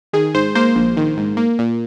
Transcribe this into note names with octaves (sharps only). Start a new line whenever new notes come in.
D#3 G#4
G#2 C5
A#3 C5
A#1
D#3
G#2
A#3
A#2